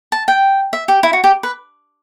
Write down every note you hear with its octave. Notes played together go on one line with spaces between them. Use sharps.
A5
G5
E5
G4
E4
F#4
G4
B4